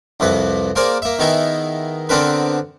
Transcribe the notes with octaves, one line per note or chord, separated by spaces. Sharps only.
C2 F2 C3 B4
A#3 G#4 A#4 C5 D5
A#3 E5
D#3 B3 D#4 E4 G#4
D3 B3 C4 D4 A#4 B4